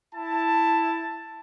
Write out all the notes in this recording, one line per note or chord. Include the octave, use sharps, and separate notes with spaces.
E4 A5